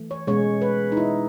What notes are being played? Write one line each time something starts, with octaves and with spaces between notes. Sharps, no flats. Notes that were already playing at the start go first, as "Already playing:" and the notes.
Already playing: E3 A3
C#5
B2 G#3 C#4 C#5
B4
D#4
E4